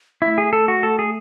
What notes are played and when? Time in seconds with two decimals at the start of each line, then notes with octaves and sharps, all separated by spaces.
0.22 A3 E4
0.38 G#4
0.53 A4
0.68 F#4
0.83 A4
0.99 G#4